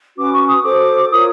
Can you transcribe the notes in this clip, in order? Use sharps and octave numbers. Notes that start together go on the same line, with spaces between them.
C#4 F#4 B4 D6
C#6
D#6
F#4 A4 C5 D6
F4 A#4 C#5 D#6